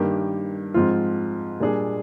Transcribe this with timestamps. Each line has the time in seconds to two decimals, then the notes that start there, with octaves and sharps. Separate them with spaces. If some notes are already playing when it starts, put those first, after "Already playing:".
Already playing: G2 D#3 A#3 D4 G4
0.74 G#2 F3 C4 F4
1.60 A#2 G3 D4 G#4